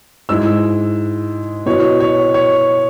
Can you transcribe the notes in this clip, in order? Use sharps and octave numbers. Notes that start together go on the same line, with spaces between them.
G#2 G#3 E4 E6
B2 B3 E4 C#5
C#5
C#5